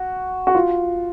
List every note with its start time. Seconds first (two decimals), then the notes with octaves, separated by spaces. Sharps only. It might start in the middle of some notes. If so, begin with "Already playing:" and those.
Already playing: F#4
0.47 F#4
0.55 F4